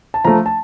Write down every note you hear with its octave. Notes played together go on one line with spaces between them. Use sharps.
A5
F3 A3 A#5
A5